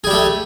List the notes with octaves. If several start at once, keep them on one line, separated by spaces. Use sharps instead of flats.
G3 A3 G4 G#4